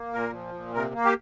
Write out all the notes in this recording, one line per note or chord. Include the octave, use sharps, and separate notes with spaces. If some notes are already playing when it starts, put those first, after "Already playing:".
Already playing: A#3
A#2 A#4
F3
A#2
C3 A#4
A#3
G4